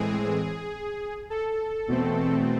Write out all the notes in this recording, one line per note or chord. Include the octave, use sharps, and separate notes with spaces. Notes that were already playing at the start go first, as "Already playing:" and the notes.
Already playing: A2 E3 G#3 C4 G#4
A4
E2 B2 A3 C4